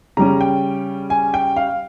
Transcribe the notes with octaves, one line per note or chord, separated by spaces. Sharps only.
C#3 G3 C#4 A#5
G5
G#5
G5
F5